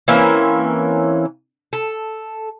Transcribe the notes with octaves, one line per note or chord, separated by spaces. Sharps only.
E3 A#3 C4 C#4
A4